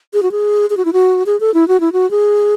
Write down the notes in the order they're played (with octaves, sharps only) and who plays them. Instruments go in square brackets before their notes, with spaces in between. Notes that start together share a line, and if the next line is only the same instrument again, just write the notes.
[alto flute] G#4
F#4
G#4
G#4
F#4
E4
F#4
G#4
A4
E4
F#4
E4
F#4
G#4